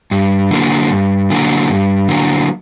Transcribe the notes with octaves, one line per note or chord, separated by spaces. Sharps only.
G2
D3 F#3 A#3
G2
D3 F#3 A#3
G2
D3 F#3 A#3